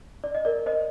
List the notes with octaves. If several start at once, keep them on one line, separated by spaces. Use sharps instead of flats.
D5
D#5
A#4 D5
C5 D#5